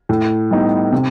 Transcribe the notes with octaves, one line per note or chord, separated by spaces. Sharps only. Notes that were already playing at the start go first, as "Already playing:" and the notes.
A2
G3 B3 D#4
C3